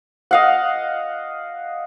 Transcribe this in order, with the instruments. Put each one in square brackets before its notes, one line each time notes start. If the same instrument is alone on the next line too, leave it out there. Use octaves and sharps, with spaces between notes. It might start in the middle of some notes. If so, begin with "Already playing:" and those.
[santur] D#5 F5 F#5